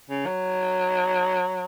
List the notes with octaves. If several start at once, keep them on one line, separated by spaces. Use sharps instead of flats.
C#3
F#3